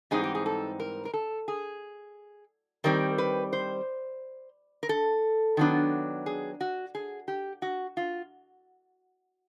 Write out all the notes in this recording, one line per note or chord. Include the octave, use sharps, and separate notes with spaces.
G#2 E3 G3 C4 D#4 G#4
G4
G#4
A4
A#4
A#4
A4
G#4
D#3 G3 C4 A#4
B4
C5
A#4
A4
D#3 F#3 B3 D4
G#4
F#4
G#4
G4
F#4
F4